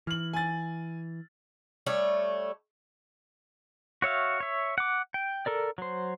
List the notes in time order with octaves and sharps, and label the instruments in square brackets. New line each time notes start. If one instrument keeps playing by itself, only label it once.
[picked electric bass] E3 [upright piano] F6 F#7
[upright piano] G#5 A6
[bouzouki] G3 A3 C#5
[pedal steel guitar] F#4 C#5 E5 F5
C#5 E5
F#5 D6
G5
A4 A#4 D5
F#3 C5